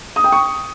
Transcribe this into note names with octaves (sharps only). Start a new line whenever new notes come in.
D#6
G5
C#6